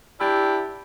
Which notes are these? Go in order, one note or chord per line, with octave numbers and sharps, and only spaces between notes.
D4 E4 G4